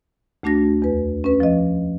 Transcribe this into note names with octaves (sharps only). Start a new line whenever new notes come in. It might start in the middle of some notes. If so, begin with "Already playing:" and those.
D2 A3 D4 F#4 A#6
E2 B4
C#4 B4
F3 D#5